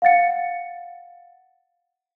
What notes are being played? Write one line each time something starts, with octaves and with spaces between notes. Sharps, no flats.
F5 F#5 A6 C#7